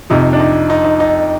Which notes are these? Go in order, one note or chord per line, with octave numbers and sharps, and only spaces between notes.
F2 C3 F3 D#4
D4
D#4
D#4
D#4
D#4